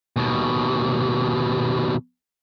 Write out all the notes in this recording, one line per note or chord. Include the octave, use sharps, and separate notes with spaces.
D#2 B2